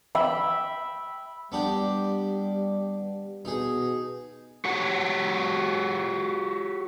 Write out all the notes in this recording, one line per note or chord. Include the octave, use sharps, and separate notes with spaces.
E5 G5 B5
G3 B3 D4 G4
B2 D#4 G#4
F#4 G4 C#5 F#5